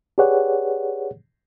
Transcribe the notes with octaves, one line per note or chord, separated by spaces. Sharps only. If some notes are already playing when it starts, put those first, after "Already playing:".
G4 G#4 B4 C#5 D5 F#5